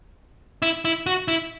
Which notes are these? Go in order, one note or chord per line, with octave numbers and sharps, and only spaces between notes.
E4
E4
F#4
E4